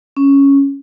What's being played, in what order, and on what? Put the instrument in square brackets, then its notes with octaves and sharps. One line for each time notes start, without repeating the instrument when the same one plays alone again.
[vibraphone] C#4